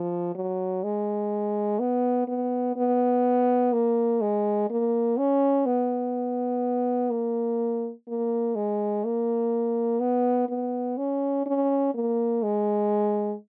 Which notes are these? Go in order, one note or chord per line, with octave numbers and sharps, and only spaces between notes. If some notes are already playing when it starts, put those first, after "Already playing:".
Already playing: F3
F#3
G#3
B3
B3
B3
A#3
G#3
A#3
C#4
B3
A#3
A#3
G#3
A#3
B3
B3
C#4
C#4
A#3
G#3